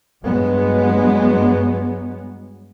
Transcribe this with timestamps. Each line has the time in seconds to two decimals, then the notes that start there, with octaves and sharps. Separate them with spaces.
0.25 G2 F#3 G#3 B3